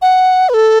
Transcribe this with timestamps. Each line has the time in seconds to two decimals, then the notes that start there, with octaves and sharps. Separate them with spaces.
0.02 F#5
0.49 B4
0.54 A4